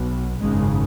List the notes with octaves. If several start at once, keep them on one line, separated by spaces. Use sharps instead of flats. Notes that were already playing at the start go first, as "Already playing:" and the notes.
Already playing: B1 B2
G#1 F#2 C#3 G#3